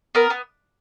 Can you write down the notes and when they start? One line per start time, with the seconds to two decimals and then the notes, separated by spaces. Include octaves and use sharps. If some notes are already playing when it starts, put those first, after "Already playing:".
0.15 B3 A#4
0.30 B3